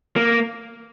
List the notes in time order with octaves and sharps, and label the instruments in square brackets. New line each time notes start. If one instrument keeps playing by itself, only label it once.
[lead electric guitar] A#3